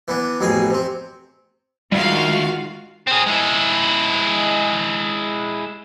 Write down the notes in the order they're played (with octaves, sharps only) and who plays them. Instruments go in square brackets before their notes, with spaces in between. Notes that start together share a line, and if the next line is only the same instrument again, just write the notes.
[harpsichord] E3 B3 D4
A1 F2 B2 G#4 G#5
C3 C4
[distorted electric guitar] D2 [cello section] D#3 G#3 F4 [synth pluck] G3 [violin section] F#4 F5
[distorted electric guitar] C4 G#4
G#3 E4